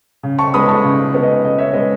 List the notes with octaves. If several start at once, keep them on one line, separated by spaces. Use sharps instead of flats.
C#3
A5 C#6
G#3 B3 B5 D#6
A5 C#6
C#3
G#3 B3
D#5
C#3 D#5
C#5 E5
G#3 B3 D#5